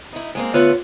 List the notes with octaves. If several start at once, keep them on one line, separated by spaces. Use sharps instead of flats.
D#4 E4
G#3 A#3 C4
D3 A3 B3 F4 B4 C#5